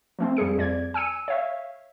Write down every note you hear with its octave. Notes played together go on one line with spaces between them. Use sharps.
F3 A3 C4
F2 G3 G#4 C#7
F2 D5 G#6
G#5 E6 C#7 D#7
C#5 E5 F5